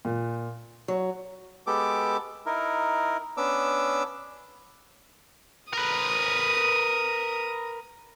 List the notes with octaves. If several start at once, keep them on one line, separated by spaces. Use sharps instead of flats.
A#2
F#3
G#3 B3 G4 A4 D6
D#4 E4 A#4
B3 C#4 D4 D6 E6
A#4 B4 D#6